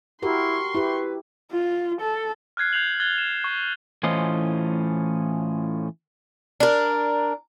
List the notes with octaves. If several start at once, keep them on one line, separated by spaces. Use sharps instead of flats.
E4 F#4 G4 A#4 C6 C#6
E4 G4 B4
F4
A4
F6 F#6 G#6 C7
G6 C7 F7 F#7
F#6 G#6 A6 G7
E7
C#6
A2 E3 C#4 F4 C5 D#5
D4 A#4